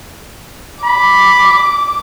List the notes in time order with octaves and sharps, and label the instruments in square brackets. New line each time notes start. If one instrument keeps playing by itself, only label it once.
[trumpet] B5 [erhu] D6